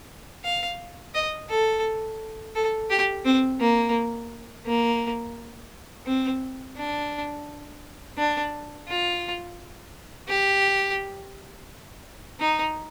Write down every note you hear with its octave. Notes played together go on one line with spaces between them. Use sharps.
F5
D#5
A4
A4
G4
C4
A#3
A#3
C4
D4
D4
F4
G4
D#4